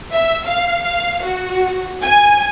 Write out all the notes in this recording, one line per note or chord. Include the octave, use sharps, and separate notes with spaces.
E5
F5
F5
F#4
G#5